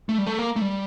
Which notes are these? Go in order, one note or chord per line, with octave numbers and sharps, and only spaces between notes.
A3
G3
A3
A#3
A3
G3